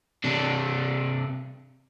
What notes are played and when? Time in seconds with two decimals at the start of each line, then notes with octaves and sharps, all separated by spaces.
0.24 C3 D4